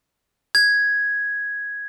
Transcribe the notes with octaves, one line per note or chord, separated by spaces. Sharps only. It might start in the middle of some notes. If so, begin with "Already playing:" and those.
G#6